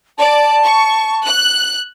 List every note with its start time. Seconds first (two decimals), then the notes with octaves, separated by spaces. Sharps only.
0.18 D5 A5
0.64 C#6
1.24 F#6